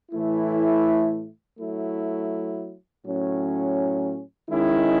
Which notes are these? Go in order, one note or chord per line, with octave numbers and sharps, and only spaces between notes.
A2 E3 A3 E4
F#3 A3 E4
A2 F#3 C#4
D#3 G#3 C#4 E4